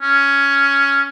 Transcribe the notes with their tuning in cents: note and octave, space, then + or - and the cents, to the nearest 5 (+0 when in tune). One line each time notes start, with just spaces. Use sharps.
C#4 +5